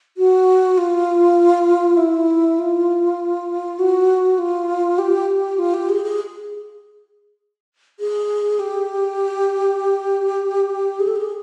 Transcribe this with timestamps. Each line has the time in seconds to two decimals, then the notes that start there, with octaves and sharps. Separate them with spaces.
0.17 F#4
0.78 F4
1.97 E4
2.59 F4
3.79 F#4
4.38 F4
4.98 G4
5.59 F4
5.74 G4
5.89 G#4
6.04 G#4
8.00 G#4
8.60 G4
11.00 G#4
11.07 A4
11.16 G#4